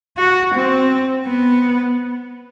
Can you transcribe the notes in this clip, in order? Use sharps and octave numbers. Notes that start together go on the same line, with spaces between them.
F#4
C4
B3